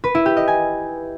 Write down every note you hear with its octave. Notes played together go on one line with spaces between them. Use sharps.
B4
E4
G4
D#5
G#5